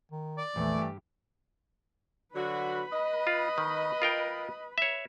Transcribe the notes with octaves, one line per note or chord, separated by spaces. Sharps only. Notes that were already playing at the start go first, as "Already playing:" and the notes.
D#3
D5
A#1 E2 E3 A3
G2 G4
D3 F#3 F#4 B4 B5
D#5
F4
D#3
F4 A#4 G5
C#5 E5